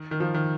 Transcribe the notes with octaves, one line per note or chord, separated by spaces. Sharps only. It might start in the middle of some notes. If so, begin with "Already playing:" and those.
Already playing: D#3
D#3
F3
D#3